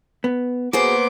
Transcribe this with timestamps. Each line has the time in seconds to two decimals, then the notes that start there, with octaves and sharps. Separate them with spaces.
0.24 B3
0.73 A#3 B3 F#4 G#4 C5 D6